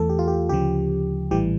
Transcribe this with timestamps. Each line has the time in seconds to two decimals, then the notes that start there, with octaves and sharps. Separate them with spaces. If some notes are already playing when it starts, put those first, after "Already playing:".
Already playing: E2 E3 A3 A4
0.09 G4
0.19 F4
0.28 G4
0.49 D2 C#3 F3 G4
1.31 A#1 A2 E3 G3 G4